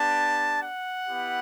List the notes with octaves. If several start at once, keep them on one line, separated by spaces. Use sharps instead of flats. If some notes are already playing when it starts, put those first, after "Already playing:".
Already playing: B3 D4 G4 A5
F#5
B3 E4 G4